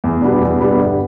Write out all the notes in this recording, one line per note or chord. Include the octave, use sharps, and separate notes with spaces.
E2
B2 G3 B3 D4
E2
B2 G3 B3 D4
G1